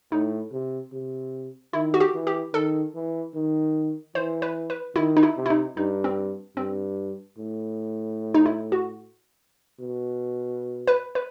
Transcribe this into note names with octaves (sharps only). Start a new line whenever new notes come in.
A2 D#4
C3
C3
D#3 E4
F#4
G4
E3
G4
D#3 A4
E3
D#3
E3 C5
B4
B4
D#3 E4
D#4
E4
C3
E4
D#4
G2 D#4
C4
G2 C4
A2
D#4
E4
F#4
B2
B4
B4